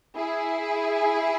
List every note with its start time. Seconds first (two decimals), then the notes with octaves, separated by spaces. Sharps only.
0.16 E4 G#4